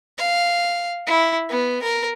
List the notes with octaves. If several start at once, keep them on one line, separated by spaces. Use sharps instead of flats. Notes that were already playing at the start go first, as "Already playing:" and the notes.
F5
E4
B3
A#4